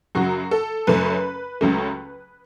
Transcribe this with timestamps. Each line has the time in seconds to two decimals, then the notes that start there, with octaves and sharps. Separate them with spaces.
0.15 F#2 C#3 F#3 F#4
0.51 A4
0.87 F#2 C#3 A3 C#4 B4
1.61 C#2 C#3 F#3 A3 C#4